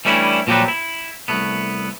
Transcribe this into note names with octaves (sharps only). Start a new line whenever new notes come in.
E3 G3 A3 C#4 D4 E4
A#2 F3 F#3 G4 A4 B4
E4
C2 A3 B3